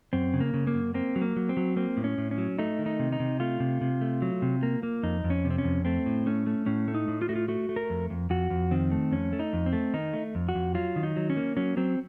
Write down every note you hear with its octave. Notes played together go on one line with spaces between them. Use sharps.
F#2 C4
C#3
A#3
C#3
A#3
F#2
A#3 C4
F#3
A#3
F#3
C4
F#3
A#3 C4
A2
C#4
A2
C#4
F#3
A3 D#4
D#3
D#4
C3
D#4
C3
A3 F4
C3
C3
A3
F#3
C3
A#3
A#3
F2 D#4
F2
C#4
C3
C4
C#4
F2
A3 C4
A2
A3 C#4
A3
A2 C#4
A3
D#4
A2
F4
A3 F#4
F4
A3 F#4
A3
A#4
F2
F2
F2 F#4
F2
D#3 C4
A3
F2 C#4
A3
D#4
F2
C4
A3
D#3 D#4
A3
F2
F#4
F2
F#3 F4
D#3
D#4
F#3
C#4
A#3
F#3 C#4
F#3 C4